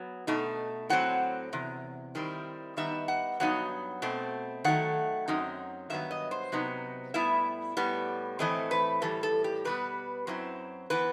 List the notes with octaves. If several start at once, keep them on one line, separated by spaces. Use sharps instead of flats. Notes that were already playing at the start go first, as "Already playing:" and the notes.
Already playing: F#3 B3
B2 A3 D#4
A2 F#3 C4 F#5
E2 C3
D#3 G3 C4 E4
D#3 G3 B3 D#4 E5
F#5
G2 F#3 B3 D#4 F#5
B2 A3 C4
D#3 F#3 A3 F#5
F#2 F#3 C4 D#4
G2 D#3 F#3 B3 E5
D#5
C5
C3 F#3 B3 D#4
A2 G3 B3 E4 E5
A2 G3 B3
A2 E3 A3 C4 D#5
B4
A2 E3 G3 A4
A4
G4
B2 G3 B3 B4
F#2 F#3 C4 E4
E3 B3 B4